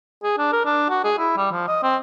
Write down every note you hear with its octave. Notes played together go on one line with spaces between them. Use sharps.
G#4
D4
A#4
D4
F#4
G#4
E4
G3
F3
D#5
C4